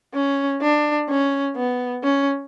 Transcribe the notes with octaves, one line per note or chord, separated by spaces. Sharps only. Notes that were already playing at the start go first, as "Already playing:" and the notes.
C#4
D4
C#4
B3
C#4